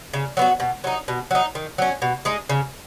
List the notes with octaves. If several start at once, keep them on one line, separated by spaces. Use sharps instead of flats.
C#3
F#3 B3 F#4
B2
F#3 D#4
B2
F#3 D#4
D#3
F#3 C#4
B2
G#3 D#4 G#4
C#3